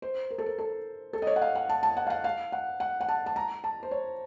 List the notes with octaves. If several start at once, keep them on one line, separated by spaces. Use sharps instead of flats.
C5
A#4
A4
A#4
A4
A4
D#5
C#5
F#5
F5
F#5
A5
A5
F#5
F5
F#5
F5
F#5
F#5
F#5
A5
A5
A#5
A5
C5
C#5